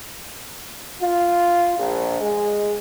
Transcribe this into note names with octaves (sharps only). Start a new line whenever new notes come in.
F4
A#1
G#3